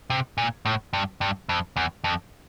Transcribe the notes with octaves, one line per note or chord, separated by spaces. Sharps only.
C3
A#2
A2
G2
G2
F2
E2
F2